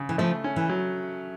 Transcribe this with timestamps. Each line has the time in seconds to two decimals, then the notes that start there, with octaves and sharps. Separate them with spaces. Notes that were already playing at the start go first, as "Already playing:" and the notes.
Already playing: C#3
0.09 E3
0.18 F3 A3
0.44 C#4
0.56 E3
0.69 F#3